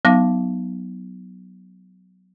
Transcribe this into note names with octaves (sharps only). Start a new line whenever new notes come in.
F#3 B3 D#4 F5 D6 A#6